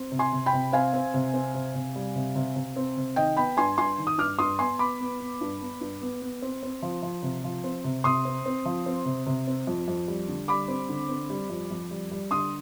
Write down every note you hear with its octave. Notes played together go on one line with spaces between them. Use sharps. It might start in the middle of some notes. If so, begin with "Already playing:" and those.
Already playing: C4
C3
G#5 C6
C3
G5 B5
C3
C4 F5 G#5
C4
C3
C4
C3
C3
G3
C3
C3
C3
C4
C3
D#3 D#5 G5
B3 G5 B5
G2 G#5 C6
G2 G#5 C6
D#3
D#6
G2 D6 F6
G2 C6 D#6
B3 G#5 C6
B3 B5 D6
B3
B3
G2
B3
G2
B3
B3
C4
C4
F3
F3
C3
F3
C4
C3
C3 C6 D#6
C4
C4
F3
C4
C3
C3
C4
F2
F2
G3
D3
G3 B5 D6
C4
D3
C4
G3
F2
F2
G3
G3
D3 C6 D#6